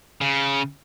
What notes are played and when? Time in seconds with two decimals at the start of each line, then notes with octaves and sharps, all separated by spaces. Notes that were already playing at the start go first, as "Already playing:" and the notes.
0.21 C#3